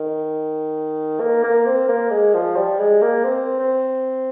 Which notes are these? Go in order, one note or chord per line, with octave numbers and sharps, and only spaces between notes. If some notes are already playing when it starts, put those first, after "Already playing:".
Already playing: D#3
A#3
A#3
C4
A#3
G#3
F3
G3
G#3
A#3
C4
C4